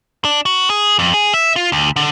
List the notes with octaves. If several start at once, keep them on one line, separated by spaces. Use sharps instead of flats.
D4
F#4
G#4
F2
G#4
E5
F4
D2
D3